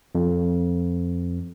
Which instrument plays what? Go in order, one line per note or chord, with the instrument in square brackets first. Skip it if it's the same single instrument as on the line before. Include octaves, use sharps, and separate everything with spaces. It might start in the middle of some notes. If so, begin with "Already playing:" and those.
[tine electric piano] F2